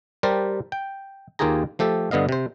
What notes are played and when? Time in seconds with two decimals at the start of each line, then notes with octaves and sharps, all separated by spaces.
0.23 G3 G4 A#4 C5 A5
0.72 G5
1.39 D#2 A#3 F4 G4 G#4 A#5
1.79 F3 A3 G4 A4
2.11 G2 D3 B3 D#5 F5
2.29 C3 C5